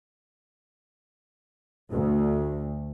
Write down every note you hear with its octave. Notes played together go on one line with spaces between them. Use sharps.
D2